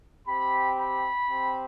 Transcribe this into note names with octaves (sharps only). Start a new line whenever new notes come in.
C4 G4 B5
B5
C4 G4